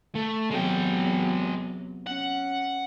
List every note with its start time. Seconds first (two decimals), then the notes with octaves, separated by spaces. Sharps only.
0.16 A3
0.51 E2 C3 F#3 G#3 G5
2.06 C#4 F#5